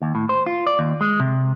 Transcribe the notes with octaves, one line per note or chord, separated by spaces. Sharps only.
D#2
A2
C5
F4
D5
D#2
G#3
C3